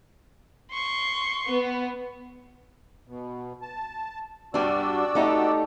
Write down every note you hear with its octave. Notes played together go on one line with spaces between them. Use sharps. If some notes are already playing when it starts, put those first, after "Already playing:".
C6 C#6
B3
B2
A5
G2 G3 D4 F#4 D5 E6
A3 D#4 G4